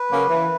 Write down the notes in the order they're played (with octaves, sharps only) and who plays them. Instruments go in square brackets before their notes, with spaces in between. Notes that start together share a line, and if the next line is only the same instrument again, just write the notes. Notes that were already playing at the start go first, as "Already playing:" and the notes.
Already playing: [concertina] B4
[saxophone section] C#3 F#3 A#3 C#4
E3